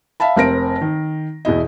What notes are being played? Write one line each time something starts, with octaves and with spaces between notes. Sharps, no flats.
E5 F5 A5 B5
F1 C4 A#4 A#6 D7
D#3
E2 B2 E4 D#5